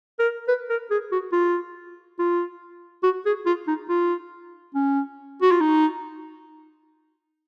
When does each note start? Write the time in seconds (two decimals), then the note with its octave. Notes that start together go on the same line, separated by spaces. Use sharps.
0.19 A#4
0.48 B4
0.70 A#4
0.91 G#4
1.12 F#4
1.33 F4
2.19 F4
3.03 F#4
3.26 G#4
3.46 F4
3.68 D#4
3.89 F4
4.75 C#4
5.42 F#4
5.51 F4
5.61 D#4